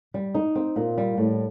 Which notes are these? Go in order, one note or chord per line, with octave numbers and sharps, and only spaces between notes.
G3
D#4
C4
A#2
G3
A2